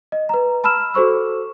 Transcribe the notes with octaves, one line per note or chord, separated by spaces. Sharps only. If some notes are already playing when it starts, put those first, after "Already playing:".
D#5
B4 A#5
A5 B5 E6 F6 E7
F#4 A4 C5 C#6 E6